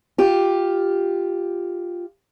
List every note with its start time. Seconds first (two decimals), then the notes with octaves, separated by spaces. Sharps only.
0.18 F4 G4